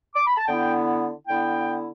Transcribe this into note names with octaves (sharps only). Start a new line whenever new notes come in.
D6
B5
A5
D3 B3 E4 G5
D3 B3 E4 G5